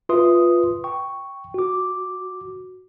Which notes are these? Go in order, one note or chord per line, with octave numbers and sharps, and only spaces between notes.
F4 B4 E5 C6 D#6
G5 C#6
F#4 D6